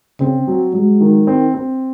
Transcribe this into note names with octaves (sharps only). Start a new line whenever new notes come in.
C#3 C4
F#3
F#3 G#3
D#3
C4
C4